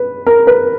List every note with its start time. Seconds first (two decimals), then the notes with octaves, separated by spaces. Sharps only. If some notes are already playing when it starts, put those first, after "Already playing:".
Already playing: B4
0.27 A#4
0.47 B4